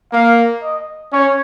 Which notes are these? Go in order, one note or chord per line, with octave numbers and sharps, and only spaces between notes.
A#3 F5
D#5
C#4 C#5